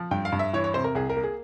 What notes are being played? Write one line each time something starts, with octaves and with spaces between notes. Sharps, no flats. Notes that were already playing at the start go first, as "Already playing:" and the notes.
Already playing: F3
G2 G5
F5
G2
E5
E3 C#5
C#5
C3 C5
A#4
C2 G#4
A#4
A#3
G#4